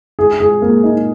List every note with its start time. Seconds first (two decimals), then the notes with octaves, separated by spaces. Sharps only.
0.19 G#4
0.40 G#4
0.62 A#3
0.83 D#4